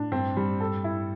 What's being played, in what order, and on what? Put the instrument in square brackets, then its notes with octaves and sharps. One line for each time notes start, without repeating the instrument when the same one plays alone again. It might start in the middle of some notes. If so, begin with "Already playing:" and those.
Already playing: [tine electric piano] A2 [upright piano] D4
[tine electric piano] G2 [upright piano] C4
[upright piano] G3
A4
E4